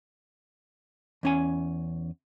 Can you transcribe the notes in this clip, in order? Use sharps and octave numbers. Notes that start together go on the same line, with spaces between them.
E2 C#4 G#5